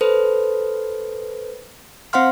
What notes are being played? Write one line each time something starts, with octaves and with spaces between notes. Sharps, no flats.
A4 B4 C5
C4 C5 F5 F#5 C6 F6